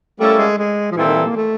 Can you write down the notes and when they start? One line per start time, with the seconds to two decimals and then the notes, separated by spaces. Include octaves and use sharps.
0.19 G3 A3 A#3 C#4 E4 A4
0.38 G#3
0.58 G#3
0.91 F3
0.97 A#2 E3 G3 C4 E4 A4
1.06 D#3
1.15 E3
1.26 A#3
1.36 A3